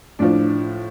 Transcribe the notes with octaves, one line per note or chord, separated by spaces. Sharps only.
A2 F3 D4